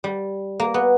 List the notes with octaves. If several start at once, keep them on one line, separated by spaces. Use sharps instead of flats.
G3
A#3
B3